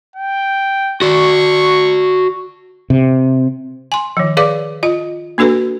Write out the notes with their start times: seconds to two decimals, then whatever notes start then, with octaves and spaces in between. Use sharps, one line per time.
0.16 G5
1.02 F#4 D5 C#6
2.90 C3
3.92 G#5 C6
4.17 D#3 F3
4.37 G#4 B4 D5 F5 D6
4.83 F4 D#5
5.38 A#3 D4 F#4 A4 B4